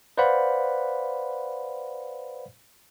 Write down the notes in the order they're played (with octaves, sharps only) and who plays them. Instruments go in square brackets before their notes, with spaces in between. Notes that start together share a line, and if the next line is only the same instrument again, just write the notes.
[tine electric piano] B4 C5 D5 F5 F#5 B5